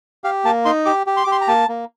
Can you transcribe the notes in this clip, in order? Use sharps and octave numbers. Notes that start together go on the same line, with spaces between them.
G4 F5
A#3 A5
D#4 C6
G4 D6
G4
C6
D6
G4
C6
A#5
A#3 A5
A#3